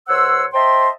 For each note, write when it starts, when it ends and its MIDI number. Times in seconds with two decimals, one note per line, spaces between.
0.08 0.45 37
0.08 0.45 72
0.08 0.45 73
0.08 0.45 78
0.08 0.45 84
0.08 0.45 88
0.54 0.90 72
0.54 0.90 75
0.54 0.90 76
0.54 0.90 79
0.54 0.90 81
0.54 0.90 84